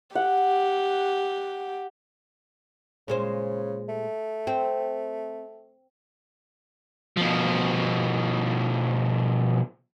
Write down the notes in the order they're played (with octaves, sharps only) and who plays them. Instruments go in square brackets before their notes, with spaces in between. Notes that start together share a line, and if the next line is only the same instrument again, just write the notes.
[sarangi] G4 [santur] F#5
[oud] A#2 G#3 C5 [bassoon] C#3
[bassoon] A3
[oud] C4
[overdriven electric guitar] B2 F3